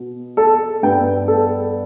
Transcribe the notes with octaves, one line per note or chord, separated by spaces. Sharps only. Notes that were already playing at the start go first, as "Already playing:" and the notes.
Already playing: B2
A4
G2 G3 B3 G5
A4